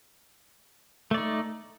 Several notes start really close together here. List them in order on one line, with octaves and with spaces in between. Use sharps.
A3 D5 D#4